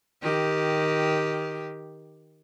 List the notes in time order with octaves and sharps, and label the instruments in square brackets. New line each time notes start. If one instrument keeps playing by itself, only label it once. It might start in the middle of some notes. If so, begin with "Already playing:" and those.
[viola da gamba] D#3 G4